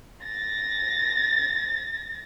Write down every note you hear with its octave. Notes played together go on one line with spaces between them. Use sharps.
A6 A#6